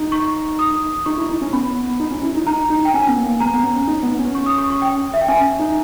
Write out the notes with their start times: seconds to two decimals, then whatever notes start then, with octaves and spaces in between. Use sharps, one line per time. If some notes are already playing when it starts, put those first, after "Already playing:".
Already playing: D#4
0.12 C#6
0.59 D#6
1.06 D#4 C#6
1.18 E4
1.30 D#4
1.42 C#4
1.53 B3 B5
2.00 D#4
2.11 C#4
2.23 E4
2.35 D#4
2.47 D#4 A#5
2.70 D#4
2.85 G5
2.94 C#4 G#5
3.07 B3
3.17 A#3
3.40 B3 A#5
3.54 B3
3.64 C#4
3.88 D#4
4.03 B3
4.19 C#4
4.35 C#6
4.46 D#6
4.58 C#6
4.70 C#6
4.82 G5
5.14 E5
5.21 G5
5.28 C#4 G#5
5.59 D#4